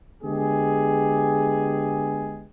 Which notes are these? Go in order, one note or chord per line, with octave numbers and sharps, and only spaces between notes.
D3 G#3 B3 G4 G#4